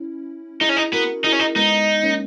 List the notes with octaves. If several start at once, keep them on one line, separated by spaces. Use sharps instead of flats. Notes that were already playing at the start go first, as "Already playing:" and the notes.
Already playing: C#4 E4
D#4 E4 G#4
C#4
D#4
B3 F#4 A#4
D#4 E4 G#4
C#4
D#4
G#3 B3 D#4
A#3 C#4